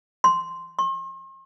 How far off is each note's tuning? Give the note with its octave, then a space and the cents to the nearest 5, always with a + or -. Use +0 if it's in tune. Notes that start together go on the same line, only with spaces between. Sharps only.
C6 -5
C6 +45